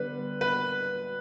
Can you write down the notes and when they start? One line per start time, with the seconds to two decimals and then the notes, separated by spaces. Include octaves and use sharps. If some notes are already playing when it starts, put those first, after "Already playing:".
Already playing: D3 G3 B3 B4
0.41 B4